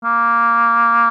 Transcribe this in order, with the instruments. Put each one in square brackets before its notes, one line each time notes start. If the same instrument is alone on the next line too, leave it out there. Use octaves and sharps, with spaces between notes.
[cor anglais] A#3